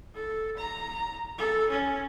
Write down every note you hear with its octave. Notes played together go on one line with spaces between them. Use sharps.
A4
A#5
A4
C#4